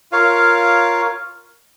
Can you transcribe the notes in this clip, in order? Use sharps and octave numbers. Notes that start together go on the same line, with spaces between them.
F4 A#4 C#5 F5